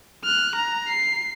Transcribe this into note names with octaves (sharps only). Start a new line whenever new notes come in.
F6 F#6
A#5
C7